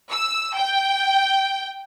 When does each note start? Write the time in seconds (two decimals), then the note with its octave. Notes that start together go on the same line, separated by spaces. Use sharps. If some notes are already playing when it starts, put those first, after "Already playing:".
0.10 E6
0.56 G5